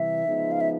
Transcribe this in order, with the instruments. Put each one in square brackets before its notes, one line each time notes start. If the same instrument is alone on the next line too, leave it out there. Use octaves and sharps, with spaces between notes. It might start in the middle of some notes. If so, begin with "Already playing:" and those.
Already playing: [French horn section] C3 E3 G3 [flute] E5
[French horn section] C#3 F3 G#3 B3 D#4
[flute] F5
E5